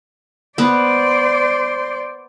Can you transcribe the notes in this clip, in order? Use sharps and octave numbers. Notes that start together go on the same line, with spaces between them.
B3 C5 D5